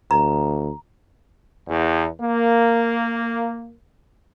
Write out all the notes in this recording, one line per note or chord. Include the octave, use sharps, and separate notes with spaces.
D2 A#5
E2
A#3